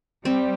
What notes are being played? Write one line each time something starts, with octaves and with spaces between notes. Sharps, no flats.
G3 C4